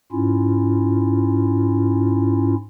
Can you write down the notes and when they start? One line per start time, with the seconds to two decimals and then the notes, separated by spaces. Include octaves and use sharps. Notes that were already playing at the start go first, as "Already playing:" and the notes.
0.12 G#2 C#4 E4 F4